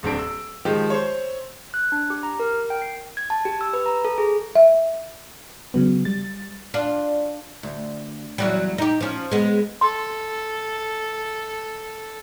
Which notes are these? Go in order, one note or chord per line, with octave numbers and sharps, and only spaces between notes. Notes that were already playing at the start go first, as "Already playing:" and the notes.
D#1 C3 D4 D7
E6
D#3 F3 G#3 G4
C5 C#5
F#6
D4
G4
A#5
A#4
G5
C7
G#6
A5
G4
E6
B4
A#5
A4
G#4
E5
C#3 F#3 B3
G3 A6
D4 F4
D2
E2 F#3 G3
D#4 G4
F3 C#4
G#3 B3
A4 C6